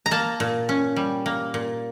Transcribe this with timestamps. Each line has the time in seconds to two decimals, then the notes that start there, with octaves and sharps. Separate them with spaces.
0.06 A#5
0.11 A#3 A5
0.40 A#2
0.69 C#4
0.96 G3
1.26 A#3
1.54 A#2